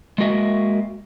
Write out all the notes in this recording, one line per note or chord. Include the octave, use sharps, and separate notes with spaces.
G#3 A#3 F#4 D#5 E5